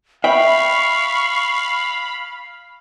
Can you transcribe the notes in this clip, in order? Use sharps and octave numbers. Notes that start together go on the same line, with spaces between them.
E5 F5 G5 B5 C#6